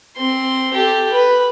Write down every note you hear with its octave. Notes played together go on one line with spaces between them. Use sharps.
C4 C6
G4 A4
B4